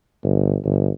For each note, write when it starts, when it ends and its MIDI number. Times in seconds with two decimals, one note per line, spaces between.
0.24 0.57 31
0.65 0.90 31